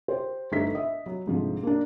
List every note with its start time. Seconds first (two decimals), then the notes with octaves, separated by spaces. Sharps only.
0.08 G4 C5
0.52 G1 A3 D#4 E5 B6
0.75 D#5 E5
1.06 F#3
1.27 C2 G#2 D3 F3
1.63 A#3 D4